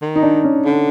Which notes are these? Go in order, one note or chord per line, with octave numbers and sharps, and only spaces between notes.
D#3
D#4
D4
C#4
D3